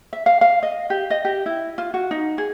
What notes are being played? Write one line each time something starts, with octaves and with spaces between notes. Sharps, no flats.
E5
F5
F5
D#5
G4
D#5
G4
E4
F4
F#4
D#4
G#4